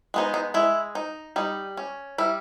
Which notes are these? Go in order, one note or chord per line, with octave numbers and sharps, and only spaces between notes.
G#3 B3 D#4
D#4
G#3 E4
D#4
G3 D#4
C#4
G3 E4